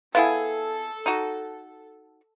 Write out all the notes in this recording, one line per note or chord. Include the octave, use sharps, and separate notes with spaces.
B3 E4 G#4 A4 F5
D#4 F#4